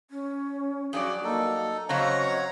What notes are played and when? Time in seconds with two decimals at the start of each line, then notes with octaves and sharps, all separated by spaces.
0.11 C#4
0.93 G2 F#3 F#4 G#4 D5
1.24 A#3 D#4 A4
1.89 C#3 F#3 C4 C#5 D#5 F#5 A#5